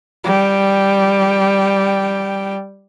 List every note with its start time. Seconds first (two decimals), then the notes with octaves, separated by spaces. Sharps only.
0.24 G3 G5